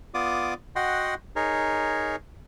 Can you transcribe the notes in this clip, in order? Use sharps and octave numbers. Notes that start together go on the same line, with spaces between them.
B3 F4 D5 D6 D#6
F#4 D#5 F#5 G5 C6
D#4 G#4 A#4 C#5